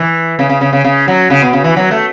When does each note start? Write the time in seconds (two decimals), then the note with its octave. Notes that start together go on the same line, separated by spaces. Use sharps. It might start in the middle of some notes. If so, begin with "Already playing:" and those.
Already playing: E3
0.39 C#3
0.49 C#3
0.61 C#3
0.73 C#3
0.85 C#3
1.08 F#3
1.30 C#3
1.42 B2
1.53 C#3
1.64 E3
1.76 F#3
1.91 A3